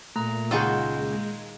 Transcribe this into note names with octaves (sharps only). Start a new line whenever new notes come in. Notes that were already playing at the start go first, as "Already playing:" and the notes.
A#2 A3 A#5
C#2 D#3 G#3 F4 F#4 G#4 E6 G6